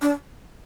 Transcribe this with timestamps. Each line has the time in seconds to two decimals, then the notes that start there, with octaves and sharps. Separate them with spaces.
0.02 D4